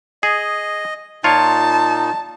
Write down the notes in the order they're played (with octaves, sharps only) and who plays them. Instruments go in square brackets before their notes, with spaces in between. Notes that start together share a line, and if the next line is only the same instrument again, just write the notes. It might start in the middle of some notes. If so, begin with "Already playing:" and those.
[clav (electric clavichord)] G#4 [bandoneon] D#5
[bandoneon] A#2 D#4 [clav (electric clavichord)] F4 C#5 [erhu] A5